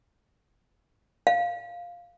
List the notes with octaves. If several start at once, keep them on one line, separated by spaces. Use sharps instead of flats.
F5